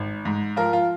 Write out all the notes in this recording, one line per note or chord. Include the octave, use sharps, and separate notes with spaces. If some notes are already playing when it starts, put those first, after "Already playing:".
Already playing: G#1
G#2
F3 F4 A#4
F4